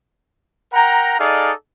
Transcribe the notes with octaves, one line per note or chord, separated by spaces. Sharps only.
A#4 F#5 G5 A#5
D#4 G#4 A4 D5 D#5 F5